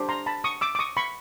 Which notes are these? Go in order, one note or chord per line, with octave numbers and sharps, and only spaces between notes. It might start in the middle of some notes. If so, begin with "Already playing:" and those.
Already playing: D4 G4 C5
A#5 C6
A5 B5
C#6 D#6
D6 E6
D6
C#6 D#6
B5 C#6